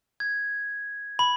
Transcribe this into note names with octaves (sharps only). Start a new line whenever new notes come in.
G#6
B5